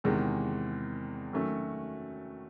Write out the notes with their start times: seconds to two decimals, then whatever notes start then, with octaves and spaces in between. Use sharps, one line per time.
0.04 E2 C3 D#3 G#3
1.33 D#3 F#3 A3 C#4 F#4